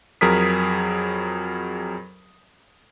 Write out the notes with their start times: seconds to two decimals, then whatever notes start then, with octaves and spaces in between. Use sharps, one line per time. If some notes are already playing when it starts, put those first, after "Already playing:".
0.21 F2 F#3 G#4 A#4 D#6 B6